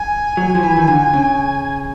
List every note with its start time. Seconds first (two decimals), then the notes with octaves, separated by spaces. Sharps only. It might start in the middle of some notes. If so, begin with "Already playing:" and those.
Already playing: G#5
0.37 F#3
0.55 F3
0.63 E3
0.76 D#3
0.87 D3
1.13 C#3